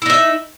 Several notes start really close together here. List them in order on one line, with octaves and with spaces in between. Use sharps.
E4 D#4 E5